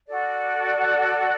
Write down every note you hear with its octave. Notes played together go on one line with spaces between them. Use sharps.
F#4 A4 D5